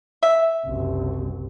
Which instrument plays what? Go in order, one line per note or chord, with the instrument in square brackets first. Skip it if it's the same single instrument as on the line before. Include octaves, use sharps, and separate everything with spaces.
[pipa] E5
[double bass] F#1 C2